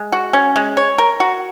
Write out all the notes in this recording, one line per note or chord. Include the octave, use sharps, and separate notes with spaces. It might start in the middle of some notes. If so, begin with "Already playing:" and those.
Already playing: G#3
F#4
C#4
G#3
C#5
A#4
F#4